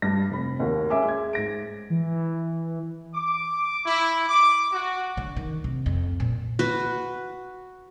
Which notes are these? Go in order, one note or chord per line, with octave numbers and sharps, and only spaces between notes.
G2 A#6
F1 B5
D#2 A#3 F#4
G#3 C#4 E5 G#5 D6
G#3 G#6
G#2 A#6 D7
E3
D6
E4
D6
F#4
D3
D#3
C3
F2
A#2
F#4 B4